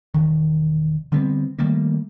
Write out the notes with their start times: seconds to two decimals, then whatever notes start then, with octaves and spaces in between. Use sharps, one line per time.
0.14 E1 D#3
1.12 D3 G3 B3 C4
1.59 D#3 G3 A3 A#3